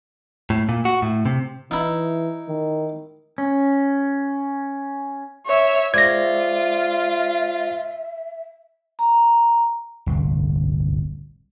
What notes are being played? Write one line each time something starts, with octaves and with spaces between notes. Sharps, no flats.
A2
A#2
F#4
A2
C3
E3 D#4 E4
D#3
C#4
C#5 E5
G#3 F4 C5 D5 E5 G#6 A#6
A#5
D1 G1 C2